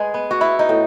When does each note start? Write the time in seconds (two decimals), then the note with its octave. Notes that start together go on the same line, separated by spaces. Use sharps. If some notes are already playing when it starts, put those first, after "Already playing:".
Already playing: G#3 G#4 B4 D#5
0.14 B3
0.31 F#4
0.41 B3 E4
0.59 D#4
0.69 A2